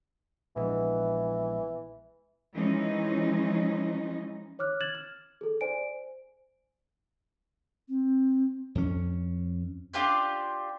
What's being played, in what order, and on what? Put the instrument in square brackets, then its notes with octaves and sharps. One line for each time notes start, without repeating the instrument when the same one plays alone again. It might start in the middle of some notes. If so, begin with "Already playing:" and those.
[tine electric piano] A#1 G#3 B3 [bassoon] E3
[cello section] E3 F3 G#3 C#4 D#4
[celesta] C#5 D6 F6 F#6
F6 G#6 A6 E7 F#7
F6
G#4 A4
C5 D5 G#5 D7
[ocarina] C4
[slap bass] F2 C#4
[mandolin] D4 F4 G4 C5